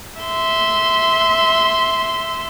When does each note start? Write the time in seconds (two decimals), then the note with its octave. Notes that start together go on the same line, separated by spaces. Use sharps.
0.20 E5 C6